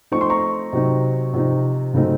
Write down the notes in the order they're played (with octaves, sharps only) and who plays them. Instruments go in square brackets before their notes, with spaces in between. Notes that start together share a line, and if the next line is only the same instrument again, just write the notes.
[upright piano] F3 A3 C4 D#4 C#6
C6
A#5 C#6
C3 F#3 C4 D#4
C3 F3 C4 D#4
C#3 F#3 A3 C4 D#4